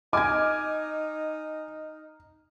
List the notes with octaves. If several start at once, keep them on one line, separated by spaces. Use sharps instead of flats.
D#4 D#5 G#5 D6 F6 G#6